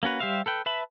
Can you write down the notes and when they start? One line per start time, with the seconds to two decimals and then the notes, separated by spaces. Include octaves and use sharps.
0.03 A#3 C#4 F#4 B4
0.20 G3 G4 C5 E5 F5
0.46 A4 B4 G5
0.66 B4 E5 A5 B5